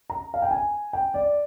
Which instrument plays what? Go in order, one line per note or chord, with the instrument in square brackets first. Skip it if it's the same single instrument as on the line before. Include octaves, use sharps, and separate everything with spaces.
[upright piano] A#5
F5
G5
G#5
G5
D5